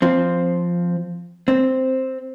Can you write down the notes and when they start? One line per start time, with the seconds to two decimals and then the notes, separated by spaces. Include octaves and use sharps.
0.02 F3 C4
1.48 C4